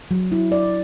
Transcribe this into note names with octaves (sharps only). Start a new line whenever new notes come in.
F#3
E4
D5